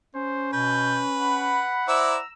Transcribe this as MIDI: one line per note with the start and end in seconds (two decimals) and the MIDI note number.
0.15 1.63 61
0.15 0.52 72
0.53 1.00 47
0.53 1.78 71
0.53 1.00 91
1.21 2.24 78
1.21 1.86 83
1.88 2.16 64
1.88 2.18 72
1.88 2.16 74
1.88 2.16 76
1.88 2.29 82
1.88 2.29 88